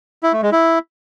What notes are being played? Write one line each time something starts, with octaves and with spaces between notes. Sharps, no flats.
E4
A3
G#3
E4